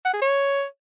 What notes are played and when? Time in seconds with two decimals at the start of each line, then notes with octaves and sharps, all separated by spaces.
0.05 F#5
0.13 G#4
0.22 C#5